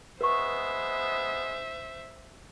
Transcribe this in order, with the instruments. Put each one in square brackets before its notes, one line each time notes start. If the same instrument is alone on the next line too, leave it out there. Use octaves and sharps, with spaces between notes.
[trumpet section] G#3 B3 [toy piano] B4 C#6 [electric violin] C5 E5